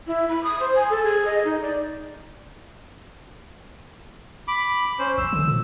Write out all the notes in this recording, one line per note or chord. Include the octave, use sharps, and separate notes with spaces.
E4
B5
D#6
C5
G#5
A4
G#4
D#5
D#4
D5
B5 D6
C#4 C5
A1 E6
D3
A#2